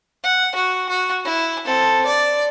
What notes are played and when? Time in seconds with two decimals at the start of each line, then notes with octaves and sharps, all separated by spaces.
0.24 F#5
0.55 F#4
0.89 F#4
1.25 E4
1.65 C4 A4
2.06 D5